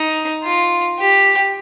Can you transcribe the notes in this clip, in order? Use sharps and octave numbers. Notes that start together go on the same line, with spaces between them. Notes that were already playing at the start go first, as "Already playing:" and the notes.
Already playing: D#4
F4
G4